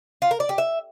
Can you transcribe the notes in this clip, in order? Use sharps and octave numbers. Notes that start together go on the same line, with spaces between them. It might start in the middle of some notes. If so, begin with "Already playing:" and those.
F4
A#4
D5
G4
E5